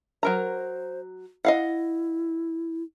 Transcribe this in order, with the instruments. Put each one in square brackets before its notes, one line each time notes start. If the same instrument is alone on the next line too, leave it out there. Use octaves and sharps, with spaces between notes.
[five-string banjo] F#3 A#4 A#5 [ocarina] C5
[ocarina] E4 [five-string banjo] D#5 F5 F#5